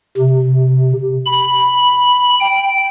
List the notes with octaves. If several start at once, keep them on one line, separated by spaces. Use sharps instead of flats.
C3
B5
G5